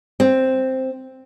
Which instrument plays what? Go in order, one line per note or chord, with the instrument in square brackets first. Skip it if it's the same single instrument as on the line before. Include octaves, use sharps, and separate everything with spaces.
[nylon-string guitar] C4